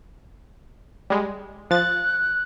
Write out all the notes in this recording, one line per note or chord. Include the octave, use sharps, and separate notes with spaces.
G3 G#3
F3 F#6 A6